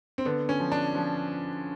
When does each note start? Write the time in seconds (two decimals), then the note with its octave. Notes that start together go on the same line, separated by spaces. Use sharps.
0.18 C4
0.25 D3 B3
0.49 C#4
0.60 F3
0.72 D4
0.95 F3